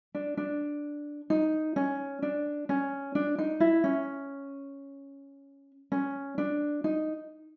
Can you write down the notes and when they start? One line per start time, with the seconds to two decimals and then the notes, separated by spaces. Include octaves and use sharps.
0.15 D4
0.37 D4
1.30 D#4
1.76 C#4
2.22 D4
2.69 C#4
3.15 D4
3.39 D#4
3.60 E4
3.84 C#4
5.92 C#4
6.38 D4
6.84 D#4